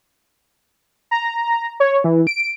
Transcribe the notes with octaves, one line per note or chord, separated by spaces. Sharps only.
A#5
C#5
E3
D7